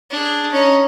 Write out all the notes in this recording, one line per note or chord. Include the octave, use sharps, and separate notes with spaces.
D4 G#4
C#4 D#4